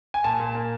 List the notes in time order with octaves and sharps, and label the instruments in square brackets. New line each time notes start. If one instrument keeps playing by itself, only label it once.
[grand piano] G#5
A#2 A5
A#2
A#3